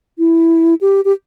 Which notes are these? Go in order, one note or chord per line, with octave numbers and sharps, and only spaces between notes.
E4
G4
G4